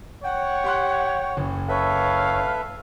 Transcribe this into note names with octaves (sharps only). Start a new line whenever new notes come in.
C#5 F#5 G5
G4 C6 F#6
F#1
A4 B4 C#5 E5 F5